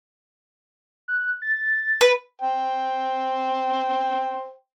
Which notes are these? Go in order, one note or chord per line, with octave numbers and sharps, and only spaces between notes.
F#6
A6
B4
C5 G5